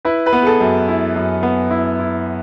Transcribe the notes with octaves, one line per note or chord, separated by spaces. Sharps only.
E4 B4
B4
B3
G#4
A4
F#2
E4
F#2
B3
E4
E4